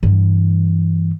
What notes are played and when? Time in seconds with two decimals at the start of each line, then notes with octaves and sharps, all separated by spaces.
0.03 G2 E3